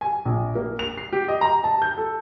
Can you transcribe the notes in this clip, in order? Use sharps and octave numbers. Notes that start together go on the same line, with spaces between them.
G#5
A#1
A#3
F7
C7
G4
D#5
A#5
A5
G6
A4